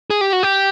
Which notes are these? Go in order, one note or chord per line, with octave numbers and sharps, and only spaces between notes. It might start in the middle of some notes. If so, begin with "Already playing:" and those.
G#4
G4
F#4
G4